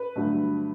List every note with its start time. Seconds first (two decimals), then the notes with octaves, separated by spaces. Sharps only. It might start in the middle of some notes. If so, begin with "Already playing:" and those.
Already playing: B4
0.16 G2 D3 F#3 A3